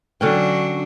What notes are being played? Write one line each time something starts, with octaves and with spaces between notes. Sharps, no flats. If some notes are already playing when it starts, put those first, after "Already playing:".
D3 F#3 C#4 D4 F#4 G5